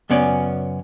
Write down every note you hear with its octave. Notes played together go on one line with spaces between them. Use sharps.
F#2 C#3 B3 C#4 D5